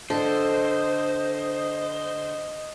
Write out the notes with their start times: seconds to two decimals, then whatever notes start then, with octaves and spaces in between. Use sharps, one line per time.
0.10 D3 D4 A4 C5 D#5